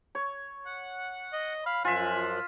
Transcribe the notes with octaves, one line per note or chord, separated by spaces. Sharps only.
C#5
F#5
D#5
F5 B5
F#2 F3 F4 E5 G#5 F#6